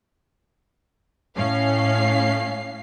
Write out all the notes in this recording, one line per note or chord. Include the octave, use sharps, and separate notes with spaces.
A2 C#4 F5 C7